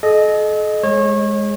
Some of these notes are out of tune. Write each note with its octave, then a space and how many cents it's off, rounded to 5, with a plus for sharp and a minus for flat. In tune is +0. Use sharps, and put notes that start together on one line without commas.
A4 -45 D#5 -10
G#3 +0 C#5 -30